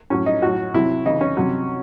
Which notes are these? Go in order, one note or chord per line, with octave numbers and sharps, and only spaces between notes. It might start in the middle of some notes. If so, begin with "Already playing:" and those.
A2 F#3 C#4
D#4
A2 F#3 F#4
C3 F#3 E4
C#3 E3 D#4
C#4
C3 F#3